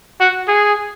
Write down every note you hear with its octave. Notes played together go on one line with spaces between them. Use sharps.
F#4
G#4